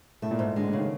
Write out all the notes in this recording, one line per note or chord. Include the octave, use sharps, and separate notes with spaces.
A2 A3
A#2
G#2
D3 G#3
D3
C#3
D#3